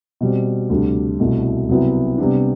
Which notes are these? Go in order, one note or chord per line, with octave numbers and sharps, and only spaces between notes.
B2 G3 C4
D2 C3 G3 D4
C2 B2 A3 E4
C2 C3 F#3 B3 E4
C3 G3 B3 D4